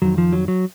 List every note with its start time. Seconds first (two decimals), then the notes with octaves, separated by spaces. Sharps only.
0.02 F2 D#3 F#3
0.18 F3
0.33 F#3
0.48 F#3